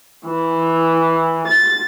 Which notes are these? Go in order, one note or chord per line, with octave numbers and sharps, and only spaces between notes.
E3
A6